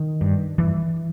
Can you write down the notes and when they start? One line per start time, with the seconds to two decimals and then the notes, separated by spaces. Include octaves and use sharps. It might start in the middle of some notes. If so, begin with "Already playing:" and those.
Already playing: D#3
0.21 G2
0.58 G2 E3